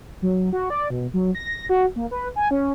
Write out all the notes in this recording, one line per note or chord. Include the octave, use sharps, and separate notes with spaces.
F#3
F#4
D5
B2
F#3
A#6
F#4
A#3
B4
G#5
C#4